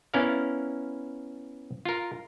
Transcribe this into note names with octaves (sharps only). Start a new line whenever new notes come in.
B3 C#4 E4 A#4 D5 F5
F4 A#4